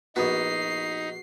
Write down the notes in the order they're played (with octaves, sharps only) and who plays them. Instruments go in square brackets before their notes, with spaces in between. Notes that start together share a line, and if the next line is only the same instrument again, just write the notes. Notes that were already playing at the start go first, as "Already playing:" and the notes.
[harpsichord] A#1 B3 [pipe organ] D#4 [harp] F#4 [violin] C7